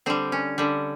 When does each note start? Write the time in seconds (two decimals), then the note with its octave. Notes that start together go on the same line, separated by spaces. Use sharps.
0.06 D3 G3 C4
0.32 C#4
0.58 D3 G3